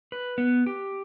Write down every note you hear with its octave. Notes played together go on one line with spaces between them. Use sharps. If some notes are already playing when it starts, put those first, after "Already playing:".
B4
B3
G4